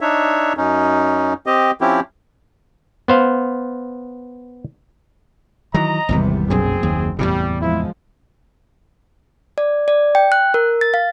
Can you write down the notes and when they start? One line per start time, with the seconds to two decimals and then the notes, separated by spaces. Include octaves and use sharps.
0.01 D4 D#4 C#5 E5
0.57 F#2 C#4 D#4
1.46 C4 G4 D#5
1.81 F3 C4 C#4 E4 G4
3.08 B3 C5 F5
5.74 D#3 E3 F#3 D#5 A#5
6.09 G#1 E2 C3 E3 G3 B3
6.50 F#1 B1 F#2 A#2 C4 G#4
6.83 D#2
7.19 E2 A2 C3 G3
7.61 F3 G#3 E4
9.58 D5
9.88 D5
10.15 G5
10.32 F#6
10.54 A#4
10.81 A6
10.94 F5